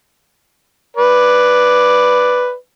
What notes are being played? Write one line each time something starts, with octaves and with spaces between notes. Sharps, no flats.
B4 D5